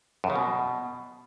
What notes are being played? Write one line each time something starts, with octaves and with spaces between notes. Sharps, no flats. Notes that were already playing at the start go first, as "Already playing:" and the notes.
F#2
C#3
B2